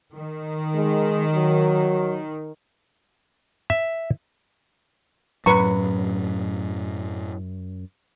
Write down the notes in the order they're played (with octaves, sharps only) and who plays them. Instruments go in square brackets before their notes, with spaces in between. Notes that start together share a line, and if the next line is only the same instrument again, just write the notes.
[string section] D#3
[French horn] G#3
F#3
[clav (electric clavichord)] E5
[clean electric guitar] F#2 [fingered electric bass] A2 F#3 A3 [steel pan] B4 C#6 [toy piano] A#5